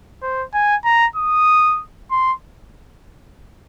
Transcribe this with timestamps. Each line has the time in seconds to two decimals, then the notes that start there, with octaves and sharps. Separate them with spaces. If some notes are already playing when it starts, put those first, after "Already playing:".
0.22 C5
0.54 G#5
0.85 A#5
1.16 D#6
2.11 C6